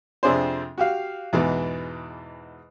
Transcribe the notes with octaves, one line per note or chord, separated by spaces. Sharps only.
F2 C3 D4 G#4 C5
F#4 G4 F5
E2 G#2 B2 E3